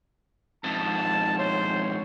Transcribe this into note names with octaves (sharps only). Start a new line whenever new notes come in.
F2 G#2 A5
C5 C#5